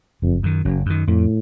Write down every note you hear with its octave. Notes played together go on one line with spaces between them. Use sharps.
F#1 F2
F#2 D#3
F#1 F#2
F#2 D#3
F2 A2